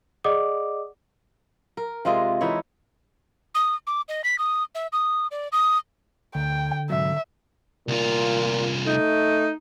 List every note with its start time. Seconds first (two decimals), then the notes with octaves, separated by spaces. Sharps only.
0.24 G#4 D5 D#5 F#5 D6 D#6
1.77 A#4
2.05 C3 G#3 F4 D#5
2.41 E3 D#4 E4 C#5
3.55 D#6
3.87 D6
4.09 D#5
4.24 B6
4.39 D#6
4.75 E5
4.93 D#6
5.31 D5
5.52 D#6
6.35 D2 D3 G5
6.90 G#2 C3 F#3 E5
7.88 C2 A#2 F4
8.86 A3 D#4